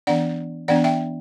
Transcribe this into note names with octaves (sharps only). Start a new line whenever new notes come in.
E3 B3 D4 D5 F#5
E3 B3 D4 D5 F#5
E5 G5